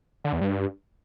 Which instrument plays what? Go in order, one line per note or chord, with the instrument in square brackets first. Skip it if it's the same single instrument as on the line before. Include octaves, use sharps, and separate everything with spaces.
[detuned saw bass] D3
E2
G2